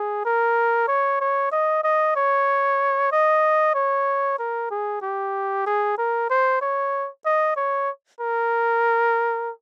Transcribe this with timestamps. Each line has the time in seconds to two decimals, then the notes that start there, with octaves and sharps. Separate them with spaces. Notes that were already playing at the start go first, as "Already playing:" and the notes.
Already playing: G#4
0.25 A#4
0.88 C#5
1.21 C#5
1.52 D#5
1.84 D#5
2.16 C#5
3.12 D#5
3.75 C#5
4.39 A#4
4.71 G#4
5.02 G4
5.66 G#4
5.98 A#4
6.30 C5
6.61 C#5
7.26 D#5
7.57 C#5
8.21 A#4